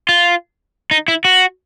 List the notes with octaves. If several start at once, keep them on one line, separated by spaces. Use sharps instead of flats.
F4
D#4
E4
F#4